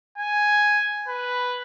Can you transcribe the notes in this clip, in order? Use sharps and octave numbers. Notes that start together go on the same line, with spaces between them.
G#5
B4